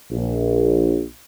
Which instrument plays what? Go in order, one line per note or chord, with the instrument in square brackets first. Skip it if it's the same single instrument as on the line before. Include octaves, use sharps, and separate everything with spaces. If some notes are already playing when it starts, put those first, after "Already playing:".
[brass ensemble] A#1